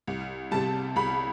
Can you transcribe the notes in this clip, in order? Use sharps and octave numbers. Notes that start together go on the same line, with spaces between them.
C2
C3 G3 A5
C2 B5